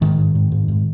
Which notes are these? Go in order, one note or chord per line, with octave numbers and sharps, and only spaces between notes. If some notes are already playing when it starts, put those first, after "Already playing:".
G#2 D#3
G#2
G#2
G#2
G#2